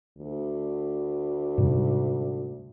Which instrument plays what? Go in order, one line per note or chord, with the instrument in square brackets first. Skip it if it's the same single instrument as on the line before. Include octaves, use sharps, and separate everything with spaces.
[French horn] D2
[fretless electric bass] G#2 C3 G3